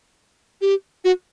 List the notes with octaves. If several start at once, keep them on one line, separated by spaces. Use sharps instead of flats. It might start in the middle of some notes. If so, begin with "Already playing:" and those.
G4
F#4